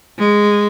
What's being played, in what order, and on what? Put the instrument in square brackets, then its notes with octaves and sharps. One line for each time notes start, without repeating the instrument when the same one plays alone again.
[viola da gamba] G#3